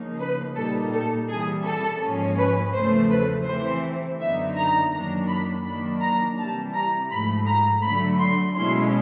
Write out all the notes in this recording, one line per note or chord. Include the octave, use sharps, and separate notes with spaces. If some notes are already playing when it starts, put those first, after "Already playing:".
Already playing: C#3 F3 A#3 D#4
B4
A#2 G3 A#3 D#4 A4
A4
C3 E3 G3 G#4
A4
G#2 F3 A#3 C#4
B4
E2 C#3 F3 A3 C5
B4
C3 E3 A3 C4 C5
F#2 D3 F#3 B3 D#4 E5
A#5
F#2 D#3 F#3 A#3 D4 A#5
B5
D#3 F#3 A#3 D4 B5
A#5
C3 E3 G3 A5
A#5
G#2 F3 A3 B5
A#5
D3 F#3 A3 B5
C6
B2 G#3 C#4 E4 C6